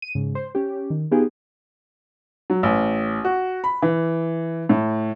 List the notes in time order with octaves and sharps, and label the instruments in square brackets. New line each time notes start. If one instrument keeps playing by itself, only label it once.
[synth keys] D#7
G#2 C#3
C5
C#4 G4
D#3
B3 D#4 F4 G4 G#4
[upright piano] F#3
A1
F#4
B5
E3
A2